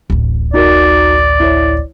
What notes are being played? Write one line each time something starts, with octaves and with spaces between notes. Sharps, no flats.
D1 A1
D#4 F#4 A#4 D5
E4 C#5